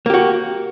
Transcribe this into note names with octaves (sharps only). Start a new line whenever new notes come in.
A#3 F#4 G4